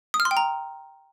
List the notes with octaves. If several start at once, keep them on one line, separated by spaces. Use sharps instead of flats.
D#6
F6
C6
G5
A#5